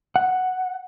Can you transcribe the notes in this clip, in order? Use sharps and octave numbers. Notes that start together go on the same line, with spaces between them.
F#5